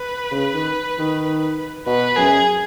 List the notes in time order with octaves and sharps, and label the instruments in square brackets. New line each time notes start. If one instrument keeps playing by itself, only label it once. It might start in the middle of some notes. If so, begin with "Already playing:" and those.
Already playing: [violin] B4
[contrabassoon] C#3
D#3
D#3
[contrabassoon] B2 [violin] B4
[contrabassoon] F#2 [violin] G#4